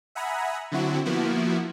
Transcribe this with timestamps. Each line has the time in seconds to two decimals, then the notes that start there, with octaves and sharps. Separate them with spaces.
0.15 E5 F#5 G#5 A#5 B5 D#6
0.72 D3 F#3 C4 E4 F#4
1.05 F3 A#3 B3 E4 F#4